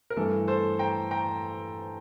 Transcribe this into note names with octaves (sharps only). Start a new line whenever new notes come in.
A#4
G2 E3 A3 A4
A4 C5
G5 A#5
G5 A#5